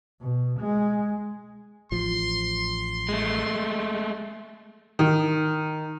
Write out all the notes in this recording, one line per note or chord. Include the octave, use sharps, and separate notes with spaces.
B2
G#3
A1 F3 C6
G#3 A3
D#3